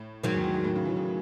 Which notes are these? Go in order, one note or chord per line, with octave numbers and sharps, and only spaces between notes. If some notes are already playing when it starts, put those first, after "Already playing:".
Already playing: A2
G#2 D#3 F#3
E2
G#2
G#2
A2
C#3
E3
C#3